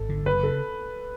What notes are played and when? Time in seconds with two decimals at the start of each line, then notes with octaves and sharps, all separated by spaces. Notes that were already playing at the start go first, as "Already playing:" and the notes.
Already playing: G#1 A4
0.09 D3
0.26 F#1 B4
0.43 C#3 A4